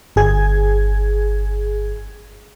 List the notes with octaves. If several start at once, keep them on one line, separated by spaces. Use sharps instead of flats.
G1 G#4 G#6